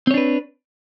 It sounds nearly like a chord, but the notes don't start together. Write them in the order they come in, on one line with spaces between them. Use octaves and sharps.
C4 C#5 D4 B4